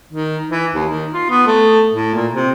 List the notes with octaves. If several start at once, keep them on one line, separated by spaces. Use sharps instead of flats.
D#3
E3
D#2
D#3
F4
B3
A3
A2
A#2
C3